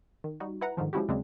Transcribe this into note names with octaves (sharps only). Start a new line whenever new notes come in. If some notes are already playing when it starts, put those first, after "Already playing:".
D#3
G3 D#4 F#4
E4 B4 F#5 A#5
G#2 D3 D#3 F3
F3 G#3 C#4 E4 F#4 G4
D#2 C#3 F#3 G#3 C4 D4